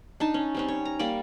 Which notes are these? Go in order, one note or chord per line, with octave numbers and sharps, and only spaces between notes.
D4 D#4 A5
C#4
G3 C4 C#4
C#5
A#5
G3 A#3 D5